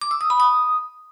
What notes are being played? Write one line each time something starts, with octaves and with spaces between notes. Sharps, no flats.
D6
E6
D#6
B5
D#6